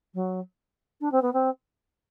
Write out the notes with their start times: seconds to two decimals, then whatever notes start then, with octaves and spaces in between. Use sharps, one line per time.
0.14 F#3
1.01 D4
1.11 C4
1.22 B3
1.33 C4